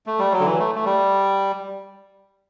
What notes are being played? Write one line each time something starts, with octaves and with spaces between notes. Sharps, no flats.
A3
G3
F#3
D3
E3
A3
A3
G3